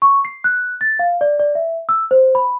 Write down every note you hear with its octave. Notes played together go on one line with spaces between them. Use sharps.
C#6
C7
F#6
A6
F5
D5
D5
E5
E6
C5
B5